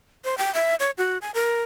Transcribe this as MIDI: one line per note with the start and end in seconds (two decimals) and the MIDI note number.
0.25 0.38 72
0.38 0.53 79
0.55 0.75 76
0.80 0.91 73
0.98 1.18 66
1.22 1.31 80
1.34 1.62 70